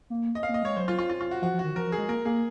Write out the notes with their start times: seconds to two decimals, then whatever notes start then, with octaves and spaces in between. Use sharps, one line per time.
0.10 A#3
0.35 D#5
0.43 F5
0.49 A#3
0.54 D#5
0.63 G#3 C#5
0.76 F#3 C5
0.88 F4
0.99 F4
1.09 F4
1.21 F4
1.31 F#4
1.42 F3 F#4
1.54 F3
1.59 F#4
1.64 D#3
1.76 F3 A#4
1.87 F3
1.92 G#4
1.98 G#3
2.09 A#3 A#4
2.25 A#3 G#4